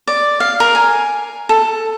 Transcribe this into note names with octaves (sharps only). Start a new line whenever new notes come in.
D5
F5
A#4
G#5
A4